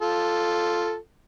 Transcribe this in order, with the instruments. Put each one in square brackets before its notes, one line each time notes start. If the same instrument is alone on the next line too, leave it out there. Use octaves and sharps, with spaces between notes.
[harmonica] F4 A4